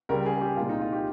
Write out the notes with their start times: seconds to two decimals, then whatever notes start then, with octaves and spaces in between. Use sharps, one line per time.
0.09 C#2 C#3 G3 A#4
0.26 G#4
0.41 G4
0.57 C2 A#2 G#3 F4
0.69 D#4
0.81 F4
0.93 G4